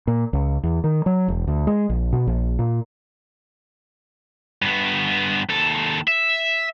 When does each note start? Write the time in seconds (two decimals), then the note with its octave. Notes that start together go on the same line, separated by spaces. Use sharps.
0.07 A#2
0.33 C#2
0.63 E2
0.84 D#3
1.06 F#3
1.28 E1
1.47 D2
1.67 G#3
1.89 A#1
2.13 B2
2.27 A#1
2.59 A#2
4.62 G2 B3
5.49 D#2 A4
6.08 E5